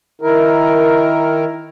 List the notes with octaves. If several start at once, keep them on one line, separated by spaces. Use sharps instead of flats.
D#3 E4 A#4